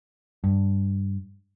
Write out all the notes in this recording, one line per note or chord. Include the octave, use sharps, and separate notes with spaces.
G2